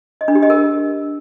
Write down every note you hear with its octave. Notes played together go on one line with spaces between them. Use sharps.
D#5
D4
G4
D#5
A#4